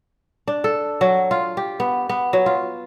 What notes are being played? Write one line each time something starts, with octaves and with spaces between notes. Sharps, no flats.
D4
A4
F#3
F4
G4
B3
B3
F#3
F4